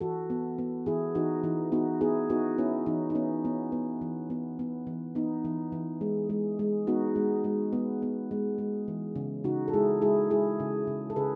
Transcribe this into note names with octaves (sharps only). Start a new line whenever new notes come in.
E3 F#4 A4
B3
B3
E3 E4 G#4
E3 D#4 F#4
E3 D#4
B3 D#4 F#4
B3 E4 G#4
B3 D#4 F#4
B3 C#4 E4
E3 D#4
D#4
B3 C#4
B3
B3
E3
B3
B3
E3
B3 D#4
E3
E3
G#3
G#3
G#3
B3 D#4 F#4
G#3
G#3
B3
B3
G#3
G#3
E3
C#3
C#3 D#4 F#4
A4
G#3 E4 G#4
G#3 E4 G#4
G#3 E4 G#4
C#3
C#3
A4
C#3 G#4 B4